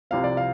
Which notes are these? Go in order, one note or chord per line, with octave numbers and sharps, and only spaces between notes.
C2 C3 F3 C4 F5
D5
F5